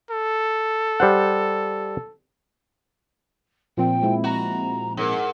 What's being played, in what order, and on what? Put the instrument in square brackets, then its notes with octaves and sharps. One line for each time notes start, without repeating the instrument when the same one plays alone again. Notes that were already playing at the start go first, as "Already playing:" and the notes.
[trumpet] A4
[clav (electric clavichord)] G3 C5 F#5
[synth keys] A#2 F3 C4 [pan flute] G5
[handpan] G#3 E4
[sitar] F#4 [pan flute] A#5
[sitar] G#2 [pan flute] A#4